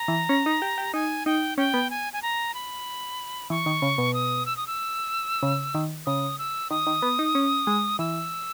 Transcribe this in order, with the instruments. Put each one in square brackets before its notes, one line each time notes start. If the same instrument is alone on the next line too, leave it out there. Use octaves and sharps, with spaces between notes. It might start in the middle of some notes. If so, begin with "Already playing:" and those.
Already playing: [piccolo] A#5
[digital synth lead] E3
C#4
D#4
G4
G4
[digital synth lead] D#4 [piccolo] G#5
[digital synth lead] D#4 [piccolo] G5
[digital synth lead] C#4 [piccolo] G5
[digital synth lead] B3
[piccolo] G#5
G#5
A#5
B5
[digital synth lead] E3 [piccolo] C#6
[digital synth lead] D#3
C#3
B2
[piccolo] D#6
E6
D#6
E6
[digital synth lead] C#3
D#3
[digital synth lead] C#3 [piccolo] D#6
[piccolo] E6
[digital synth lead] D#3 [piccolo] D#6
[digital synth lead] D#3
B3
D#4
C#4
G#3
[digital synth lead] E3 [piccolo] E6